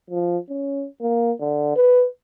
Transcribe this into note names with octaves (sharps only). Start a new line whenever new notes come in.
F3
C#4
A#3
D3
B4